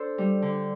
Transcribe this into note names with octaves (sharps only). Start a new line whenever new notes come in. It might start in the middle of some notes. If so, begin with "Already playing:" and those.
Already playing: D4 A4 C5
G3
D3